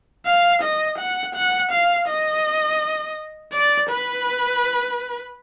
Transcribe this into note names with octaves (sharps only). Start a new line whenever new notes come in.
F5
D#5
F#5
F#5
F5
D#5
D5
B4